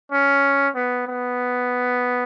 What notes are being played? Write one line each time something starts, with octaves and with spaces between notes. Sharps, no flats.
C#4
B3
B3